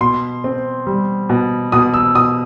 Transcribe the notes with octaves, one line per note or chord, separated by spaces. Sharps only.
B2 C6
C4
G3
B2
B2 D#6
E6
B2 D#6